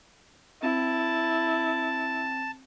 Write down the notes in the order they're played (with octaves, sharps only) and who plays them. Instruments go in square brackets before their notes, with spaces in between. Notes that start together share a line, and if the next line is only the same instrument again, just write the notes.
[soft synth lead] C4 [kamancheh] E4 [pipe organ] A5